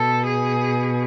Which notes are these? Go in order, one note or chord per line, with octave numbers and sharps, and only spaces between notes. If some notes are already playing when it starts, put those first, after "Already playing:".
Already playing: B2 A4
G#4